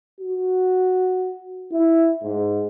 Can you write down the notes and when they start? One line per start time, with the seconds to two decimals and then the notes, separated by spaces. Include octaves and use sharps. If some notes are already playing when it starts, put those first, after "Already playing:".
0.21 F#4
1.72 E4
2.23 G#2